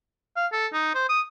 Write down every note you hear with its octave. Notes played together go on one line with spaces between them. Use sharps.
F5
A4
D#4
C5
D#6